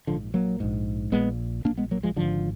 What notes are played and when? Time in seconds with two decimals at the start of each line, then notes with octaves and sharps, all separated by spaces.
0.07 A#1 G#2 D3 F3
0.34 F#3 A#3
0.60 A#1 G#2
1.12 A#1 A#2 G#3 B3
1.65 A#2 A#3 D4
1.69 A#1
1.78 G#3 B3
1.91 F#3 A#3
2.03 F3 G#3
2.16 G#1 G#2 D3 F3